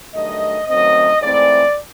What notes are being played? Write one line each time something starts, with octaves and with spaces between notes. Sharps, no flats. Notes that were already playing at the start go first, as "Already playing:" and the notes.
G2 D#3 F#3 A3 D#5
F#2 D#3 F#3 A3 C4 D#5
G#2 E3 A3 C4 D5